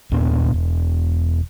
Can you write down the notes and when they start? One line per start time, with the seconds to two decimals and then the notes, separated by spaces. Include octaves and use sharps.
0.11 D#2 A#2 B3 D4
0.54 E1